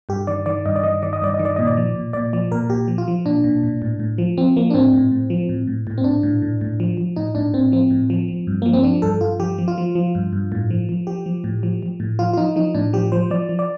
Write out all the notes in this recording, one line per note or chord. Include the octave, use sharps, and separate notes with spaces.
G2 G4
D#3 D5
D#3 D5
G2 D#5
D5
D#3 D#5
D#3 D5
D#5
G2 D5
D#5
D#3
D5
A#2 D#5
D5
F3
A#2
A#2 D5
F3 D5
A#2 A#4
A#2 G4
F3
F4
F3
A#2 D4
A#2
A#2
A2
A2
F3
F3 C4
F3 A#3
D4
A2 C4
A2
A2
F3
A2
A2
A2
C4
A2 D4
A2
A2
A2
F3
F3
A2 D#4
A2 D4
A2 C4
F3 C4
A2
F3
F3
G2
F3 A#3
C4
F3 D4
G2 A4
G2 F4
F3 G4
F3
F4
F3
F3
G2
G2
A2
F3
F3
F3 G4
F3
A2
F3
F3
A2
F3 F4
F4
F3 D#4
F3 D#4
A2 D4
F3 G4
F3 C5
F3 D5
F3
D5